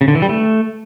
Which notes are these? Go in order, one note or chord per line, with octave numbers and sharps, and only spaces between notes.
C#3
D3
E3
G3
A3